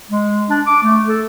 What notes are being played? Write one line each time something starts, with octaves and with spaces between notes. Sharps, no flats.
G#3
D4
D6
A3
A4